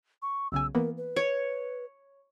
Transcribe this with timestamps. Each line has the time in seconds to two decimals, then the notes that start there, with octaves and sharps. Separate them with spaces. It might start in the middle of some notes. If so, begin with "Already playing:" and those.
0.22 C#6
0.52 B1 C#3 G#5 E6
0.75 E3 A#3 B3 A#4
0.97 B4
1.16 C#5 D7